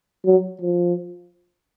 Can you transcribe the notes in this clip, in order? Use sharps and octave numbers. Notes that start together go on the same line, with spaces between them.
F#3
F3